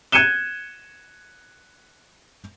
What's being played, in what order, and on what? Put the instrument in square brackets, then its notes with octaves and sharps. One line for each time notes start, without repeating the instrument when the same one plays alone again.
[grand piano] F#6 G#6 C#7 D#7 E7 G7